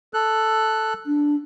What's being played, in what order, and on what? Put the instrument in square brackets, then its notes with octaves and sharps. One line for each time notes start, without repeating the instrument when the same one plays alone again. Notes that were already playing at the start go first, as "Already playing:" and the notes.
[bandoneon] A4 F#6
[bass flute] D4